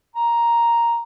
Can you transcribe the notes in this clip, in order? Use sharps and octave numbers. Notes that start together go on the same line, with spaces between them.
A#5